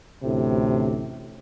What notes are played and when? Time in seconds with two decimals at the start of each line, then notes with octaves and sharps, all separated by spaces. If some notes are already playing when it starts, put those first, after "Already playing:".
0.23 A1 D2 A2 C3